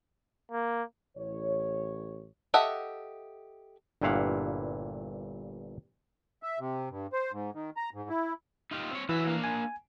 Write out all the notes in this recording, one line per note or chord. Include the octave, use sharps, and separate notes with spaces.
A#3
A1 C#5
G4 A4 D#5 E5 F#5
G1 G2 A#2 E4 F5 F#5
E5
C3
G2
C5
G#2
D#3
A#5
G#2
E4
D#4 F4 G4
C4 C#5
E3 F#3 E5
A#3 D4 F5
G#5